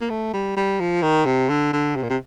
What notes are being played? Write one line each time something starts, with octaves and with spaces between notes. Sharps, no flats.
A#3
A3
G3
G3
F3
D#3
C3
D3
D3
C3
A#2
C3